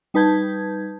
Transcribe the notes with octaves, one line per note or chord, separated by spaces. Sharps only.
G3 D#4 B4 A5 G6 G#6